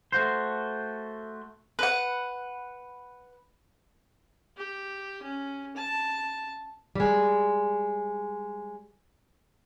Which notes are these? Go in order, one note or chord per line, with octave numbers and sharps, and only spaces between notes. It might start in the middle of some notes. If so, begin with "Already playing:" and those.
A3 F#4 C5
B4 F#5
G4
C#4
A5
G3 G#3